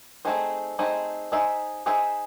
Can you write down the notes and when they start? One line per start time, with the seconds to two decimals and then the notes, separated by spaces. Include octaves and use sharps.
0.25 A3 C4 D#4 G#4 C5
0.79 A3 C4 D#4 G#4 C5
1.32 D#4 G#4 C5 E5
1.86 D#4 G#4 C5 E5